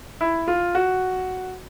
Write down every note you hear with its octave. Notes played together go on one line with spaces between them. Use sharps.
E4
F4
F#4